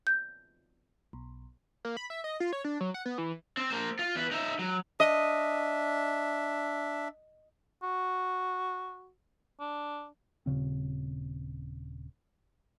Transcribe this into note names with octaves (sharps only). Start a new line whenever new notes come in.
G6
B1
A#3
B5
E5
D#5
F4
C#5
D4
F#3
F#5
B3
E3
C4
A#3 C5
F4
E2 B4
D#4 E5
F#3
D4 D#5 E5
F#4
D4
D#1 B1 C#3 C4